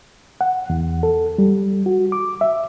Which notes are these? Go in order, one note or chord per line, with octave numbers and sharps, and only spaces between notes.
F#5
E2
A4
G3
F#4
D6
E5